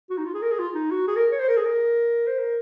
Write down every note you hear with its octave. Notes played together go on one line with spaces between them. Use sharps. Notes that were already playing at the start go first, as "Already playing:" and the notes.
F#4
D#4
F4
G#4
A#4
G#4
F4
D#4
F#4
G#4
A#4
C#5
C5
A#4
G#4
A#4
C5
A#4